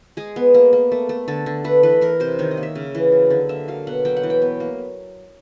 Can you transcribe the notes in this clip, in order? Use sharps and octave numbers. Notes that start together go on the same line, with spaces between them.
G#3 G#4
B3
A#3
A#3
A3
A3
D3 A4
D3
A3 B4
E3 B4
E3 A#4
C3 C5
D#3 C#5
D#5
A#3
E5
C#3
E3
F#3
D3
A#3 E5
F#3 F5
B2 F#5
F#3 G5
F#5
E3
G5
B3
A#3